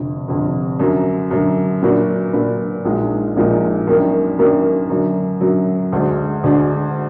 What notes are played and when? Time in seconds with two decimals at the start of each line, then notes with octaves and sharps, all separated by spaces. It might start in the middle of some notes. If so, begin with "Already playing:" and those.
Already playing: F1 F2 D3
0.28 F1 F2 D3
0.79 F#2 D3 F#3
1.31 F#2 D3 F#3
1.82 A#2 F#3 D4 F#4 B4
2.33 A#2 F#3 D4 F#4 B4
2.85 A#1 A#2 F3 G#3 D#4
3.36 A#1 A#2 F3 G#3 D#4
3.87 F#2 D#3 A#3 D4
4.39 F#2 D#3 A#3 D4
4.90 F#2 D3 F#3
5.41 F#2 D3 F#3
5.92 D2 D3 G#3 D4
6.44 D2 D3 G#3 D4